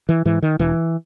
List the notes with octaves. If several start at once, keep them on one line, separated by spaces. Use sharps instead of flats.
E3
G#2 E3
D#3
E1 E3